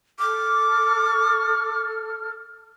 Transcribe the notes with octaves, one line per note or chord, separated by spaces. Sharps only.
A4 D6 F6